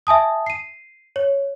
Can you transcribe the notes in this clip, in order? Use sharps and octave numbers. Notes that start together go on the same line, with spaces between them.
E5 G#5 A5 D#6
C7 D#7
C#5